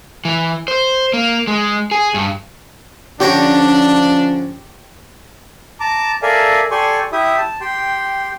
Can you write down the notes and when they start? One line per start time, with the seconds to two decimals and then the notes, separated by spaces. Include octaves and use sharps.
0.25 E3
0.68 C5
1.13 A#3
1.47 G#3
1.91 G#4
2.14 G2
3.20 D3 F3 C#4 D4 G4 C#5 A#5
5.80 A5 A#5 D6
6.22 A4 A#4 D5 E5 F5 G#5
6.71 G4 A4 D5 G#5 C6 C#6
7.12 E4 G4 E5 D#6
7.38 A5
7.61 G4 G5 C6